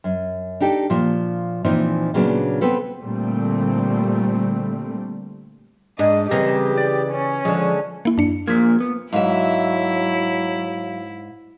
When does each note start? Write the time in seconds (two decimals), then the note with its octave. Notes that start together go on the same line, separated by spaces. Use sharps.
0.04 F#2
0.60 D4 D#4 G4 A4
0.90 A#2 F3
1.65 A#2 E3 F3 C4 D#4
2.14 A#2 C#3 F#3 B3 C4 D4
2.61 B3 C4 A4 B4
3.01 A#2 D3 G3 A3 C4
5.99 G#2 D4 D#5
6.31 C#3 E3 G3 C4 G4 A#4
6.78 D5
7.11 C#4
7.45 D3 F3 G#3
8.05 A#3 E4
8.18 F#2 D4 C#7
8.48 A#2 F3 A#3 G#6 B6
8.80 B3
9.13 G#2 F#3 E4 E5 F5